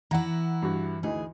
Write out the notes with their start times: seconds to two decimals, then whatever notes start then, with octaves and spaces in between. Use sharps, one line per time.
0.11 E3 E4 F#5 A#5
0.62 G2 F#4
1.03 D2 E3 D#4 G#4